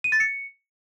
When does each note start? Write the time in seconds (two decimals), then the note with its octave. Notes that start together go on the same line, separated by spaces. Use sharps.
0.04 D#7
0.12 A6
0.20 C#7